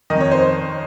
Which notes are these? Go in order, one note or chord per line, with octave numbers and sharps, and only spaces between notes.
F2 D#3 D#5
C#5
C5